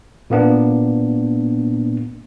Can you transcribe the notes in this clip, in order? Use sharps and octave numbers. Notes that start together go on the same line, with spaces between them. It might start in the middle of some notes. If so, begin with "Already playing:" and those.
A#2 A#3 B3 D4